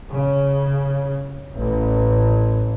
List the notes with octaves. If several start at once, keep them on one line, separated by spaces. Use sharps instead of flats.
C#3
A1